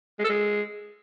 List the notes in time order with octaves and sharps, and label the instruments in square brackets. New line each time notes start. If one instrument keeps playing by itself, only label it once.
[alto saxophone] G#3
A4
G#3